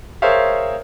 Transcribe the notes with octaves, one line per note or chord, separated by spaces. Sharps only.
G#4 A#4 C5 C#5 E5 F5